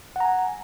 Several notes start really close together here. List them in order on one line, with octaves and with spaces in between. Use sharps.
F#5 A#5 G#5